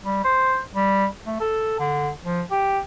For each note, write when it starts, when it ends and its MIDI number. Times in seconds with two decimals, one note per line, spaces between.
0.05 0.20 55
0.24 0.60 72
0.74 1.06 55
1.26 1.38 57
1.40 1.74 69
1.79 2.10 50
2.23 2.42 53
2.51 2.80 67